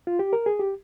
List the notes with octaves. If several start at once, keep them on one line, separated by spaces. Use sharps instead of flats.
F4
G4
A#4
G#4
G4